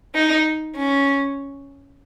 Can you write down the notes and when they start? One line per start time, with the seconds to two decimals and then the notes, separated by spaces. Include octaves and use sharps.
0.15 D#4
0.76 C#4